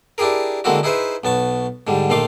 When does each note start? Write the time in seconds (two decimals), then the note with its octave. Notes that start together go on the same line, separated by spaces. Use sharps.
0.18 D4 E4 G4 G#4 A#4
0.64 D3 G#3 A#3 C4 E4 F#4
0.83 D#4 E4 G#4 B4 C5 E5
1.24 B1 B3 A5 C#6
1.87 G#2 D3 G3
2.10 A#1 D#3 A3 F5 C6 D6